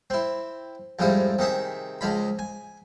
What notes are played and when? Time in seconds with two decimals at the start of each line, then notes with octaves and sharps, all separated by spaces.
0.10 C4 E4
0.99 F2 G#2 F3 G3 E4
1.39 C3 D#3 G#4 E5
2.01 C#2 F3 G#3 B5
2.39 G#5